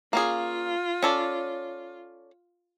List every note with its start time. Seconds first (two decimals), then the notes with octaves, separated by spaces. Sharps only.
0.13 A#3 C#4 F4 G#4
1.03 C#4 A4 D5